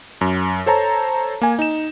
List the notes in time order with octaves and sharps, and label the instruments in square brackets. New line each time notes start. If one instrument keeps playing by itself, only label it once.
[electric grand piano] F#2
A4 C5 C#5 A5 A#5
A#3 G#5
D#4 E7